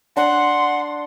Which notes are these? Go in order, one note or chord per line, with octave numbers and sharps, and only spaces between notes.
D4 F#5 C6